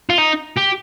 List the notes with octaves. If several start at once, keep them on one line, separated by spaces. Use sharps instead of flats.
F4
D#4
G4